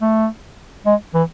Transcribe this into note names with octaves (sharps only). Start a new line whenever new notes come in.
A3
G#3
E3